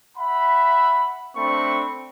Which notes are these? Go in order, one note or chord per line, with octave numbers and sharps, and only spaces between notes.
E5 F#5 B5
A3 C4 D4 B5 C#6